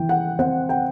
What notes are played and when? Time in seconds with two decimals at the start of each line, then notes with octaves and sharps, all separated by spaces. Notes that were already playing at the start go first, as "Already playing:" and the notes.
Already playing: E3 G5
0.09 F#5
0.39 C4 F#5
0.69 G5